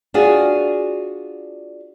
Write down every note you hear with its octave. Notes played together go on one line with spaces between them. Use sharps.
D4 F4 F#4 G#4